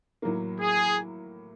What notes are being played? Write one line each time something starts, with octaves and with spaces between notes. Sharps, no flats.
A2 F#3 A#3
G#4